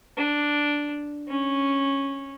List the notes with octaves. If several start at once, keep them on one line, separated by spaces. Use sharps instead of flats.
D4
C#4